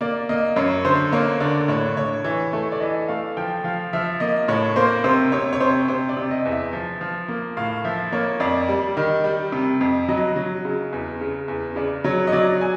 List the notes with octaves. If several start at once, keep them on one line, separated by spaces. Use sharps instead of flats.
A#3 D5
A#3 D#5
F#2 C#5
D3 C5
A#3 C#5
D3 D5
A2 C#5
A2 C#5
E3 C#5
A3
D5
E3 D#5
A3 F5
F3 G5
F3 F5
F3 E5
A#3 D#5
A2 C#5
A#3 C5
C3 C5
C3 C#5
C#5
C3 C5
C3 C5
D5
C3
D#5
E2
E5
F3
F3
A#3
A2 F5
F3 E5
A#3 C#5
F2 D5
G3
D#3
G3
C3
F2
F#3 D#5
F#3
C#3
E2
C#3
E2
C#3 D5
F#3 C#5
D#5
F#3 D5
G#5